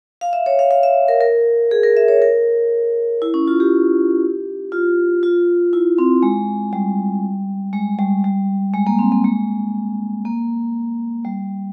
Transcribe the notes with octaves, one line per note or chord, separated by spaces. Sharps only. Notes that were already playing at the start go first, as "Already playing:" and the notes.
F5
E5
C#5
F5
F5
E5
A#4
A#4
G#4
A#4
E5
C#5
A#4
E4
C#4
F4
G4
F4
F4
E4
C4
G#3
G3
G#3
G3
G3
G#3
A#3
C4
A#3
G#3
A#3
G3